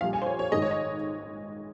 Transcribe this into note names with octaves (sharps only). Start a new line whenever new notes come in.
A#1 A#2 G3 F5
G#5
C5
C#5
C#5
G#1 G#2 D#3 G#3 D#5
C#5
D#5